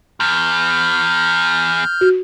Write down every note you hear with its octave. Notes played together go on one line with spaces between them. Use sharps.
E2 F6 G6
F#4